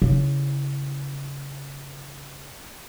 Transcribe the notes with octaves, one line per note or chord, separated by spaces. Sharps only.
C#3 E4